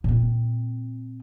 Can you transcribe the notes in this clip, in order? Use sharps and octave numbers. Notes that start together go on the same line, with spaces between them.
A#2 C4